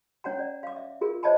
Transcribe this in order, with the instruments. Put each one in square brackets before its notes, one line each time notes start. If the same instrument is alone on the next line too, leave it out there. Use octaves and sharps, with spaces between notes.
[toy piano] C#4 C#5 F#5 A#5
D5
F5 D6
E5
F4 G#4 A#4
C5 C#5 D#5 E5 A5 B5